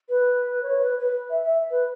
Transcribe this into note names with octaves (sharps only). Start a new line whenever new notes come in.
B4
C#5
B4
B4
E5
E5
B4